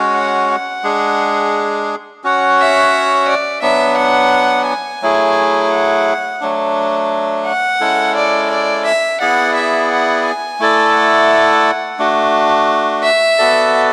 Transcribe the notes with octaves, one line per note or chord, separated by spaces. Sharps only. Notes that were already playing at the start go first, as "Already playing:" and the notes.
Already playing: G#3 C#4 F#4 C#5
F#5
F#5
G#3 D4 G#4
C#4 F#4 C#5 F#5
E5
D5
F#3 B3 D4 E5
F#5
G#5
F#3 A3 E4 G#4
F#5
F#3 A3 D4
F#5
G#3 C#4 E4 A4
D5
D5
E5
B3 E4 G#4 D5 F#5
E5
F#5
G#5
A3 E4 A4 D5
F#5
A3 D4 F#4
E5
B3 F#4 A4 D5